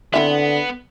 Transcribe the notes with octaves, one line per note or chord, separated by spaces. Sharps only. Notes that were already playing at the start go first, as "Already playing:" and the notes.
D3 B3 C4 E4 E5